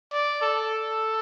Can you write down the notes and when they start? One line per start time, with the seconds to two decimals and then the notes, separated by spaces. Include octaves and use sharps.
0.12 D5
0.42 A4